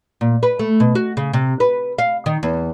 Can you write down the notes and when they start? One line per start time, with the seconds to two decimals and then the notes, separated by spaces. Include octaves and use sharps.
0.21 A#2
0.43 B4
0.59 A3
0.80 B2
0.95 F#4
1.17 C#3
1.33 C3
1.60 B4
1.98 F5
2.26 D#3
2.43 E2